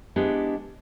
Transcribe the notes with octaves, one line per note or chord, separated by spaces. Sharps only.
G#3 B3 D4 E4 G4